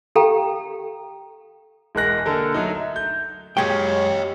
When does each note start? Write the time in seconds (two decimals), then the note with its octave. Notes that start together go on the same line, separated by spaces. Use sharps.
0.15 G4 A4 F5 G5 A#5
1.95 E1 G#3 A#4 F#6 A#6
2.26 D3 A#3 A4 A#4
2.54 F#3 A3 D#4
2.75 E5
2.96 G6
3.57 F#2 G#3 G4 C#5 G5